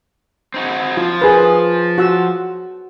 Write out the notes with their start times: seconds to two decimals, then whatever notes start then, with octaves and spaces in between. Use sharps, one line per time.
0.54 C4 D#4 F#4
0.97 F3 F4
1.22 G#4 A#4 B4
1.98 F#4 F#5 E6